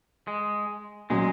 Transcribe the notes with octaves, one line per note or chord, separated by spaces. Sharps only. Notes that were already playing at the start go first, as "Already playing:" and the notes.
G#3
A#2 F#3 G#3 C#4